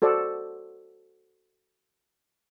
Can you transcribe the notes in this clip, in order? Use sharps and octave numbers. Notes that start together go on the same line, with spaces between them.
F#4 A4 C5 D5